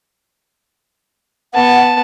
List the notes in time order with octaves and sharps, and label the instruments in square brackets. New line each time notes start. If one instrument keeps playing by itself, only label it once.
[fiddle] B3 A5 [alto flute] F#5